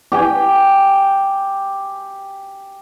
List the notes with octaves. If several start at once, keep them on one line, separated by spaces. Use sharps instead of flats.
G4 G5 G#5